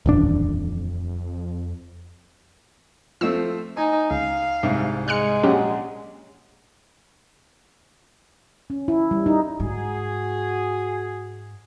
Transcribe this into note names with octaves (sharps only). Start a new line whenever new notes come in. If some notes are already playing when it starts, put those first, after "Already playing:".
D#1 A1 F2 D4
F3 A3 C4 E6
D#4 G#5
C#2 F5
C2 G#2 E5
G#3 F6 F#6 C#7
A#1 F#3 C#4 G4 F#5
C#4
E4
G3
D#4
G#2 F#4 G#4